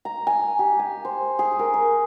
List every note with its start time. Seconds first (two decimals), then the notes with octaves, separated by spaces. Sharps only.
0.05 A#5
0.27 G#5
0.59 G4
0.79 G#5
1.05 C5
1.39 G#4
1.59 A#4
1.74 A#4